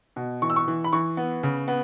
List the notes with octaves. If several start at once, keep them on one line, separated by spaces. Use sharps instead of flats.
B2
E3 C#6
E6
C#6
E3
B5
E3 C#6
B3
C#3
B3